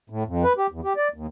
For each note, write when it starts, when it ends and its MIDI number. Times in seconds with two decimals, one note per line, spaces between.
0.10 0.23 45
0.27 0.43 41
0.44 0.53 71
0.58 0.67 67
0.72 0.81 40
0.84 0.93 67
0.97 1.08 74
1.14 1.27 39